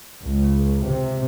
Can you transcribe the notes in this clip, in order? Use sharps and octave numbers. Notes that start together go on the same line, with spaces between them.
C#2
C3